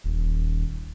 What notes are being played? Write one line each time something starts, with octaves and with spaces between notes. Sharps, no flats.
D#1